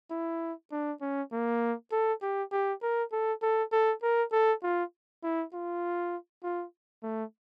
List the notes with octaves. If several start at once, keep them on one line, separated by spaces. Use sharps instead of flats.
E4
D4
C#4
A#3
A4
G4
G4
A#4
A4
A4
A4
A#4
A4
F4
E4
F4
F4
A3